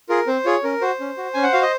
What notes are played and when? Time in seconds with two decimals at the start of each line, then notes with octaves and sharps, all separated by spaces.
0.09 F4 G#4 A#4
0.27 C4 C5
0.45 F4 G#4 C#5
0.64 C#4 A#4
0.81 F#4 C5
1.00 C#4
1.17 F#4
1.34 C#4 G#5
1.43 F#5
1.53 F#4 F5
1.62 D#5